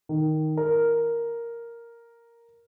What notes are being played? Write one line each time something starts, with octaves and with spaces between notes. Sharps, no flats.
D#3
A#4